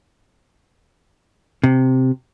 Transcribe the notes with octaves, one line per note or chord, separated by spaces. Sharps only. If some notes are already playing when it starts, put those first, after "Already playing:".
C3